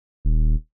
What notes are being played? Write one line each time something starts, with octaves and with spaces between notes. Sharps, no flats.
D#1